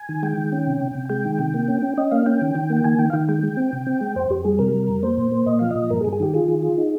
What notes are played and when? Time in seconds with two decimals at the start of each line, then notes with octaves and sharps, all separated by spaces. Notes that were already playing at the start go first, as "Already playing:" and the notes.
Already playing: G#5
0.09 D#3
0.23 G#3 G5
0.38 D#3
0.52 C#4
0.67 C3
0.81 C3
0.95 C3
1.10 G#3 G5
1.25 D#3
1.39 C3
1.54 A#3
1.68 C#4
1.82 C#4
1.97 C#4 D#5
2.11 A#3 F5
2.26 C#4 G5
2.41 D#3
2.55 D#3
2.70 A#3
2.77 G5
2.84 D#3 G#5
2.99 D#3 G5
3.10 F5
3.13 D#3 G5
3.28 G#3 G5
3.43 G#3
3.57 C4
3.73 C3
3.87 C4
4.01 G#3
4.16 F2 C5
4.30 F2 G4
4.44 G3 G#4
4.59 C3 A#4
4.74 G3
4.89 F2
5.03 A#3 C5
5.17 A#2
5.32 A#3
5.46 A#2 D#5
5.59 F3 F5
5.71 A#2 D#5
5.90 G2 A#4
6.01 G#4
6.05 G2
6.13 G#4
6.20 D#3 G4
6.34 F4 G#4
6.48 D#3
6.62 F4
6.78 D#4